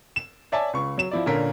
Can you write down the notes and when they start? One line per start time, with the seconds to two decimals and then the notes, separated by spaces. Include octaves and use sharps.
0.16 E7
0.52 C#5 D5 E5 G#5 A5
0.73 C#2 C#6
0.98 F#3 E7
1.11 F3 E4 D5
1.26 A#2 D3 C#4 A#4 B6